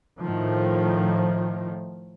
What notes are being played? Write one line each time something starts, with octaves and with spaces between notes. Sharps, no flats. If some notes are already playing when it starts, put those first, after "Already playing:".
A2 D#3 F3